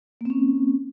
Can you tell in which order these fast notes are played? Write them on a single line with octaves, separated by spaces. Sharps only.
A#3 C4 C#4